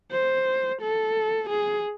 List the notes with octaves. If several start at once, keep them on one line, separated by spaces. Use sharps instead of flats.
C5
A4
G#4